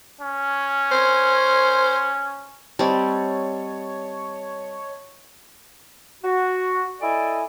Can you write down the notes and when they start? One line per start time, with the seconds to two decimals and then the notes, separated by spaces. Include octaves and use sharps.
0.21 C#4
0.92 C5
2.79 G3 C4 C#5 D#5 A5
6.23 F#4
7.01 E4 A4 D5 D#5 G#5